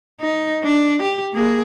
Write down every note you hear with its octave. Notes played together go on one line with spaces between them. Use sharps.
D#4
D4
G4
A#3 G#4